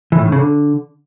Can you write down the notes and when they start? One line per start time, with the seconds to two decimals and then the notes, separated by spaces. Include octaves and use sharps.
0.12 E3
0.19 A2
0.26 D#3
0.32 C#3
0.39 D3